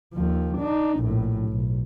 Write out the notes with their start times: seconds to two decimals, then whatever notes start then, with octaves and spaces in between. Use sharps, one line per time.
0.14 D#2 F3
0.58 D4 D#4
1.00 A#1 A2
1.49 B1